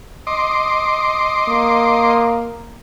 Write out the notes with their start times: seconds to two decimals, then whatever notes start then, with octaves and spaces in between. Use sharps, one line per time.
0.27 D#5 C6 D6
1.48 A#3